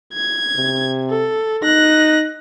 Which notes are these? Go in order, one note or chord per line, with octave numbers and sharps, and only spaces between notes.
G#6
C3
A4
D#4 F#6 A#6